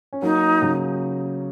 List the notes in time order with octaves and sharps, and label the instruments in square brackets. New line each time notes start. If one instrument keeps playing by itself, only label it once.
[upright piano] C#4
[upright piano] F#3 A#3 [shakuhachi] D#4
[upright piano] C#3 F#3